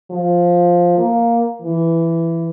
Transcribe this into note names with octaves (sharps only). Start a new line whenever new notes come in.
F3
A#3
E3